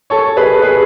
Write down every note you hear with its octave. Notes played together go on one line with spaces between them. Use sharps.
A4 C#5
G#4 B4
G#4 B4